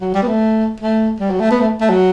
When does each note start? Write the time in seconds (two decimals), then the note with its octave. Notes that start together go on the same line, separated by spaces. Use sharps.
0.01 F#3
0.14 G3
0.22 B3
0.27 A3
0.80 A3
1.20 G3
1.30 F#3
1.40 A3
1.51 B3
1.60 A3
1.80 A3
1.89 F#3